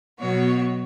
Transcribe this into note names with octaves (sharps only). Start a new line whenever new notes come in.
B2 F#3 B3 F#4 C#5